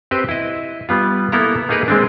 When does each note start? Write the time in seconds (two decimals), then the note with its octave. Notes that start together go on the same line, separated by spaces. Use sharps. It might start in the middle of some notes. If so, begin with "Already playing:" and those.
0.11 C4 G4 B4 C5
0.29 E4 D#5
0.89 G3 B3 F4
1.32 A#3 B3 E4 A4 A#4 A#5
1.69 A#3 D#4 G#4 A#4 B4
1.88 G#3 C4 D4